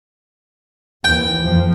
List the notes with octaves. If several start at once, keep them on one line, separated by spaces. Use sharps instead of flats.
D#2 E3 G5
F2 F3